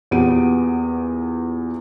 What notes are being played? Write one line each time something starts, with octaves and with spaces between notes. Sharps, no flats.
E2 A#2 B3 G4 D7 D#7